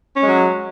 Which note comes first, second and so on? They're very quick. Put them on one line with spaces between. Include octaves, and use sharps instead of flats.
C#4 G#3 F#3